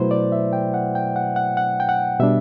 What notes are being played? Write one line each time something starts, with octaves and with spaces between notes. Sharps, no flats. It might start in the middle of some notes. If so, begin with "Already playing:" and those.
Already playing: B2 F#3 A3 E4 B4 C5
D5
E5
G5
F#5
G5
F#5
F#5
F#5
G5
F#5
B2 G3 D4 E5